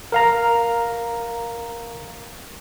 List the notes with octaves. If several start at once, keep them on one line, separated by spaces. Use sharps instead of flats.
A#4 F5 A#5